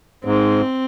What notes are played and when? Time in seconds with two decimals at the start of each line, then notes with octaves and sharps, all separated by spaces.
0.24 G#2 C4